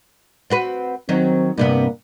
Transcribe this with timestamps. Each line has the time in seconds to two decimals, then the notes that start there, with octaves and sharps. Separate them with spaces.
0.50 C4 F#4 B4
1.09 D#3 F#3 C4
1.58 G2 C3 A#3 B3